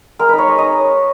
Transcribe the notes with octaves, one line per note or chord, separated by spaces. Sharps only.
G#3 A#4
D#4 B4
C#5
G#3 D#5
D#4 D#5